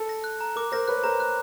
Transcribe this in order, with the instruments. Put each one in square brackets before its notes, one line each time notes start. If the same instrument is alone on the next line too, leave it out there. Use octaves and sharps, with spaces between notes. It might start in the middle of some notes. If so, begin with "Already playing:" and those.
Already playing: [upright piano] A4
[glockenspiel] A#6
F#6
A#5
[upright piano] A#4 [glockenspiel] D6
[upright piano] A#4 C5 [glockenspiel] A#6
[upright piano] B4 C#5 [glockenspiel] F#6
[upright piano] A#4 C5 [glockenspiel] A#5
[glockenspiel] F#6